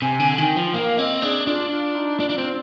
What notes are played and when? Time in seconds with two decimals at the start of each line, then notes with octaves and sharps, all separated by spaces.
0.02 C3 G#5
0.20 D3
0.38 D#3 G#5
0.43 G5
0.56 F3
0.74 A#3 F5
0.98 C4 D#5
1.22 D4 G#4
1.47 D4 F4
1.71 F4
1.95 D#4
2.19 D4 F4
2.29 D4
2.38 C4